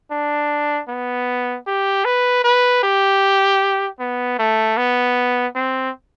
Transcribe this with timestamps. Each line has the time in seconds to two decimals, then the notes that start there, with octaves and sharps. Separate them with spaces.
0.11 D4
0.89 B3
1.67 G4
2.05 B4
2.44 B4
2.84 G4
4.00 B3
4.39 A3
4.77 B3
5.55 C4